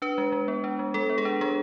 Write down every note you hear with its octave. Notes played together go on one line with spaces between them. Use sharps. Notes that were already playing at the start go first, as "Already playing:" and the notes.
D4 B4
G#3
G#3
B3
D4
G#3
G#3 A4
B3
G#4
D4
G#3 G#4